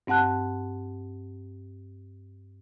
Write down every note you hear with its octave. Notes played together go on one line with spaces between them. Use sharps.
G2 C4 F#5 A5 F#6